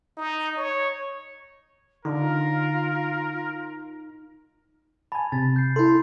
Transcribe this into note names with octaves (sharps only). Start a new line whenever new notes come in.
D#4
C#5
D3 D#4 F4 A#4
G#5 A5 B5
C3 A6
G6 C7
E4 A4 B5 C6